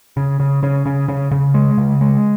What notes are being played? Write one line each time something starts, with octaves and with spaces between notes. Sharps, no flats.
C#3
C#3
C#3
C#3
C#3
C#3
G#3
C#3
G#3